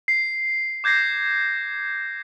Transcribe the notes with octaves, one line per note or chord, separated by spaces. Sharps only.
C7
D6 G6 G#6 A#6 C7